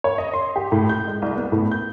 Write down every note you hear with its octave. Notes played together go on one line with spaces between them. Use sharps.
C#5
D#5
C6
G4
A2
G6
G#3
C2
B3
A2
G6